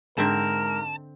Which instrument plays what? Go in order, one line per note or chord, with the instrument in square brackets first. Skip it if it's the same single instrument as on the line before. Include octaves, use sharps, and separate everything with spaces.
[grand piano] G#2 [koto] D3 C4 E5 [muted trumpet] A#4 [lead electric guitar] A5